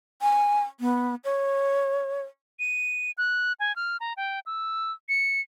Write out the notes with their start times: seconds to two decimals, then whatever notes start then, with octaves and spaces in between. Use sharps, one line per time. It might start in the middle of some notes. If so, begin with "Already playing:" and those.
0.22 G#5
0.80 B3
1.24 C#5
2.59 D#7
3.18 F#6
3.60 G#5
3.76 F6
4.00 A#5
4.17 G5
4.46 E6
5.09 C#7